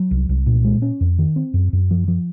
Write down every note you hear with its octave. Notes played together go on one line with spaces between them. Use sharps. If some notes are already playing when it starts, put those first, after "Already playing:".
Already playing: F#3
C2
C2
A#2
G#3
C#4
F2
D#3
C4
F#2
F#2
F3
F3